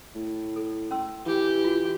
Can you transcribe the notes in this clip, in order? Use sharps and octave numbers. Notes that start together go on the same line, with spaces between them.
A2
A4
C#4 C6 E6
E3 G4
F4 F#4